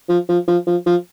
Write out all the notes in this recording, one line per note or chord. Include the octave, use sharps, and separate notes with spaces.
F3
F3
F3
F3
F3